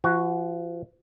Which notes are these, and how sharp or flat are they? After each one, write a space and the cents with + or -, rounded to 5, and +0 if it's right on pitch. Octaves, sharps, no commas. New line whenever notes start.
F3 -35 F#4 +0